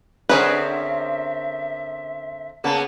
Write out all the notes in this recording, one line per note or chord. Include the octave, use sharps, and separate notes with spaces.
D3 C4 C#4 G#4 A#4 B4 E5
C#3 A#3 B3 A5